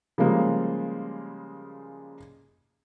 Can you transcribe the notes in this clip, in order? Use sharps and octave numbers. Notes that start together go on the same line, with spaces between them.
C#3 F3 G3 G#3 A#3